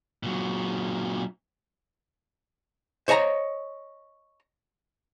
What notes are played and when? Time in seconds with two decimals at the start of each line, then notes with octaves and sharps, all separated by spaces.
0.23 A#2 F#3
3.08 C5 C#5 D#5 A5 A#5